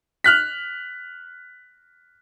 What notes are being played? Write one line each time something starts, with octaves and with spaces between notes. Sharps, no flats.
F6 F#6 B6